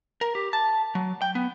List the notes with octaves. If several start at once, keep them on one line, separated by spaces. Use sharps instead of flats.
A#4
G4
A5
F#3
G5
B3